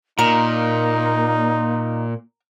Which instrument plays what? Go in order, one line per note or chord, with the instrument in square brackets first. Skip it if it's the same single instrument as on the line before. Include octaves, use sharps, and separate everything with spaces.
[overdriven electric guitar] A#2 [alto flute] A#3 [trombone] D#4 [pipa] A#4